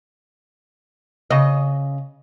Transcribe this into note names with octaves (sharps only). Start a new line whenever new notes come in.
C#3 D#5